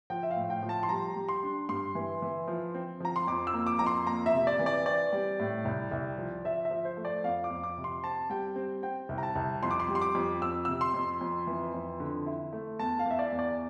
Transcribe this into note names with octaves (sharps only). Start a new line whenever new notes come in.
F3 G5
E5
F5
A2
G5
F3
A5
C6
G3 A#5
G3
C6
D4
G2 C6
E3
E3
F3
C4
F3 A#5
C6
F2 D6
E6
A#3
D6
F2 A#5
C6
A#3 A#5
E5
C3
D5
E3
D5
C4 D5
G3
A2
C2
C2
F3
F3 E5
E5
F3
C5
A3
D5
F2 F5
D6
F2
D6
C3
C6
C4 A5
G3 G5
C4
C4 G5
C2
A#5
A5
C2
F2 C6
D6
C6
G3
C6
D6
F2
F2 E6
C3 E6
C6
F2
F2
E3
F2
D3
E4
A3
E2 A5
F5
E2 E5
D5
E2
D5